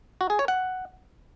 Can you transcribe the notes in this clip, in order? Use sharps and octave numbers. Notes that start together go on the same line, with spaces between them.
F#4
G#4
C#5
F#5